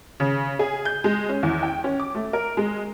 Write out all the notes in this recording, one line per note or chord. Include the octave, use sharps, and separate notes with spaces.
C#3
G#4
G6
G#3
C#4
E2
G5
C#4
D6
A3
A#4
G#3